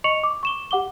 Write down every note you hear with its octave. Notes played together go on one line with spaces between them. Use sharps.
D#5 C#6 C#7 F7 F#7
D6
C#6 E7 G7
G4 F#5 D6 G7